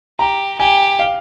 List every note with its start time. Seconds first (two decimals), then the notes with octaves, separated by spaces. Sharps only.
0.19 G4 A#5
0.59 G4 G#5
0.99 F5